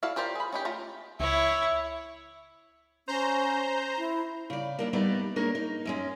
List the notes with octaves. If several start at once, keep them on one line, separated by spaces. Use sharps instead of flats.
E4 F#4 A4 D5 F5
F4 G4 A#4 C5 D5
G#4 B5
C#4 D#4 G4
A3 F4 A#5
C#2 E4 C#5 E5
C#4 C5 A#5 G6
E4
C#3 D5
A#3 D4 E4
G3 A3 B3 D#4 D5
G#3 A#3 D4 A#4 C#5
D#4
F#2 G#3 C#4